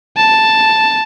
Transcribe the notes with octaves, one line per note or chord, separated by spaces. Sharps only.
A5